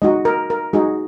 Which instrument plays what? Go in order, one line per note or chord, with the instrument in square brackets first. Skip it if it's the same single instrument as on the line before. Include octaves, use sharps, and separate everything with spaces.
[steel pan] G#3 D#4 F#4 D#5
A#4
A#4
G#3 D#4 F#4 G#4